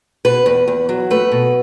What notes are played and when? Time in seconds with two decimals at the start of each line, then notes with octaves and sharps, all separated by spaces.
0.25 B2 B4
0.46 E2
0.68 E2
0.89 F#3
1.11 A3 B4
1.32 B2